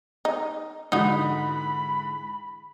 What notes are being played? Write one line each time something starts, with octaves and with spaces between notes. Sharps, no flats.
D#4
G#2 D3 E3 D#4 F#4 B5